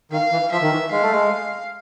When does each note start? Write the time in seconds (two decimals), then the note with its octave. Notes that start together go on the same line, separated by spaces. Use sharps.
0.11 D#3 F5
0.31 E3
0.52 F3 E5
0.62 D#3
0.72 E3
0.91 G#3 F5
1.02 A3
1.12 G#3